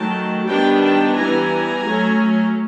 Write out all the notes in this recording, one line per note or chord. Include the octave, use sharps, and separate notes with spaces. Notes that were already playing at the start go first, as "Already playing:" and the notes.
Already playing: D#3 F#3 A3 G5 A5
D#3 G3 B3 D4 G5 A5
G5 A5
E3 G3 B3 G#5 A#5
F#3 A3 C#4